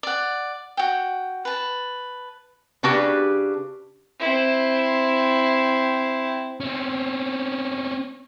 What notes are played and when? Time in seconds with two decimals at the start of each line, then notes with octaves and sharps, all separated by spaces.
0.03 D5 F#5
0.77 F#4 G5
1.45 B4 A5
2.83 C#3 D4 F#4 G4 B4
4.20 C4 E4
6.60 C4 C#4